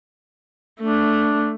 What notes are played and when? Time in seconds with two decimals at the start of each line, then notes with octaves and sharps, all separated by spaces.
0.81 A3 D4